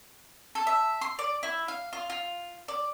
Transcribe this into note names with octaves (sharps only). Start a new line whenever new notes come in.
A4
E5
C6
D5
E4
F5
F4
F4
D5